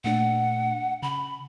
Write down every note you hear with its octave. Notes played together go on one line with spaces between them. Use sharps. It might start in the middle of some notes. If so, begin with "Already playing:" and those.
A#2 A3 D4 F#5
C#3 B5